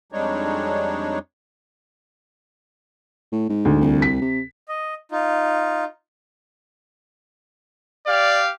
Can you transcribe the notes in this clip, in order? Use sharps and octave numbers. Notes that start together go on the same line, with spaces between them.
F2 G3 G#3 D4 D#4 C#5
A2
G#2
D2
C2
B6
C3
D#5
D#4 F4
G4 D5 F5